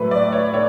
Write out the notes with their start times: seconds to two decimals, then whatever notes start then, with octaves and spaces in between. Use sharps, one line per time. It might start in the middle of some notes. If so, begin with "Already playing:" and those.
Already playing: A2 F#3 B4
0.11 D5
0.32 C#5
0.54 A2 C#5